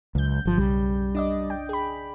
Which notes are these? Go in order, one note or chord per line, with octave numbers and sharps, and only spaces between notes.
C#2 F#2 G6
G1 F3
B1 C#3 G3
D4 D5 D#5
G5
G#4 B5